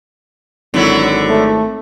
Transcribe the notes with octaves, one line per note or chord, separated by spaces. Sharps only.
G#1 D3 F#3 E4
A3